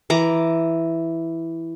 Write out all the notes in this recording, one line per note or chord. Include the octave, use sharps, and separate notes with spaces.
E3 A#5 D6